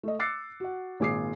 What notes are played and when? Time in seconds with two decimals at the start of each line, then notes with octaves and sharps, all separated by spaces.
0.03 A3 D#5
0.19 D6 E6 F#6 A6 C7 C#7
0.60 F#4 F#5
1.00 G#1 A#2 G#4 D6 D#6 C7